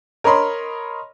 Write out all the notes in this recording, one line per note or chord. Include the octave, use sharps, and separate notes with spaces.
A#4 C#5 D#5 B5 C6